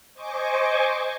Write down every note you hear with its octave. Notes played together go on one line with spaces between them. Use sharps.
C5 D#5 G#5 C#6 D6